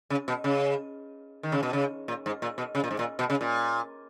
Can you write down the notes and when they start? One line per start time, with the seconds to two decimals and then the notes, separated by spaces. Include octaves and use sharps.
0.10 C#3
0.28 B2
0.44 C#3
1.43 D#3
1.52 C#3
1.63 B2
1.73 C#3
2.08 A#2
2.26 G#2
2.42 A#2
2.58 B2
2.75 C#3
2.84 A#2
2.91 G#2
2.99 A#2
3.19 B2
3.30 C#3
3.41 A#2